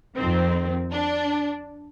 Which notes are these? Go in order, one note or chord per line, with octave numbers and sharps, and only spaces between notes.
F2 D#3 C4
D4